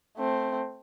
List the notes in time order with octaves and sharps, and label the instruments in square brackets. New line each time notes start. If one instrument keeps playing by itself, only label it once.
[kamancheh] A3 C4